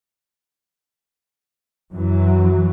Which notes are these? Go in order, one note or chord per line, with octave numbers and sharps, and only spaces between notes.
F#2 E3 F#3